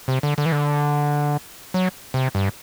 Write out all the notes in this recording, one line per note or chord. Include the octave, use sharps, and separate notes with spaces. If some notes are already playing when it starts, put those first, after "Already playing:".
C3
D3
D3
E3
D3
F#3
C3
G2